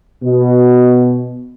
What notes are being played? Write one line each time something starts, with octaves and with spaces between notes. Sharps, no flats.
B2